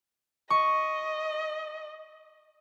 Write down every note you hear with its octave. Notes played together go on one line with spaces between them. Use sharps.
D#5 C#6